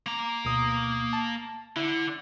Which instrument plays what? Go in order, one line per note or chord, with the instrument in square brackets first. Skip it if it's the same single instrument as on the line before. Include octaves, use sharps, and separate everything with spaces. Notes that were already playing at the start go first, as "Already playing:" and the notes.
[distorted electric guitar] A#3 A#5 [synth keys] D6
[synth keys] D2 B2 D#6
A5
[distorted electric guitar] D3 [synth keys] E4